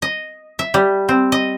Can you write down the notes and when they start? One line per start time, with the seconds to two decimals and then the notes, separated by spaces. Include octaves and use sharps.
0.02 D#5
0.59 E5
0.74 G3
1.09 C4
1.32 D#5